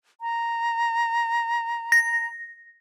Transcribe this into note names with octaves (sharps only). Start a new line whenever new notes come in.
A#5
A#6